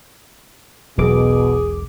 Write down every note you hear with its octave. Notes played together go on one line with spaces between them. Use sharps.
E1 B1 E2 B2 G#4 D6